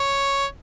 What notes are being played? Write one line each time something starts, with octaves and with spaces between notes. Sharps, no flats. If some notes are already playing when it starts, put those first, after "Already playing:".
Already playing: C#5